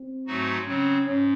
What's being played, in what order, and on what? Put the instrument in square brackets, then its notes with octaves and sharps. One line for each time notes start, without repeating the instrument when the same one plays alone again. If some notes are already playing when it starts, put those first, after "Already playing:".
Already playing: [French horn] C4
[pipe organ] G#2 F#3 A3 D#4 F#4
[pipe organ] C#3 F#3 C4 [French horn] C#4
[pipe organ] G#2 [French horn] C#4